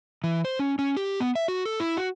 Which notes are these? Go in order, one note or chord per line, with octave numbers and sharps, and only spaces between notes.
E3
C5
C#4
C#4
G4
B3
E5
F#4
A4
E4
F#4